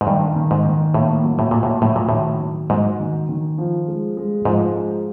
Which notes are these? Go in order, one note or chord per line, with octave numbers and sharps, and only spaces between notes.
G#2
G2 D#3
D#3
G#2
D#3
A2 A#3
F#3
A2
A#2 A#3
A2
A2 F#3
A#2
A2 D#3
F#3
G#2 F#3
D#3
D#3
F3
G#3
G#3
G#2 F3
G#3